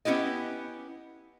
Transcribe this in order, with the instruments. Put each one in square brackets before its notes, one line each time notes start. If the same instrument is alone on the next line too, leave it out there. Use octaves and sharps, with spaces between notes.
[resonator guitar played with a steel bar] B3 C#4 E4 G4 D#5